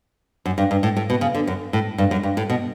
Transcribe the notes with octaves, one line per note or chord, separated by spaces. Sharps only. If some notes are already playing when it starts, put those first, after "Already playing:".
F#2
G2
G2
A2
A2
B2
C#3
D3
F#2
A2
G2
F#2
G2
A2
B2